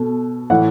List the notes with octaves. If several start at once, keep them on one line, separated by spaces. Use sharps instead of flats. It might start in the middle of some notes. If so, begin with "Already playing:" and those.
Already playing: B2 A4
A2 E3 F#5